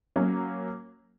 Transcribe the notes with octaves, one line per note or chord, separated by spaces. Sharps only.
F#3 A#3 C#4